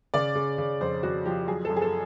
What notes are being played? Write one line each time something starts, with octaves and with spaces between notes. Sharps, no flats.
C#3 D5
C#3
C#3
F2 C5
F2 F#4
F3 G4
F#3 G#4
A4
F#2
G#4
A4